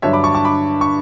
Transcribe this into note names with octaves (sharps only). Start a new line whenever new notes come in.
G2 D3 F#3 C#5 E5
B5 D6
A5 C#6
A5 C#6
B5 D6
C#6